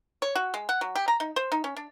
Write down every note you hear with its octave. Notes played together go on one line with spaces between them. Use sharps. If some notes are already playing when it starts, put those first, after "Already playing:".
C#5
F#4
G#3
F#5
F#3
G4
A#5
D#4
C5
D#4
C#4
D4